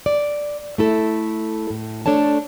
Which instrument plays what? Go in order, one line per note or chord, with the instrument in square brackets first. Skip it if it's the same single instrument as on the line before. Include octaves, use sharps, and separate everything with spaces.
[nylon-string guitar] D5
A3 E4 A4
A2
A3 D4 A4 C#5 A5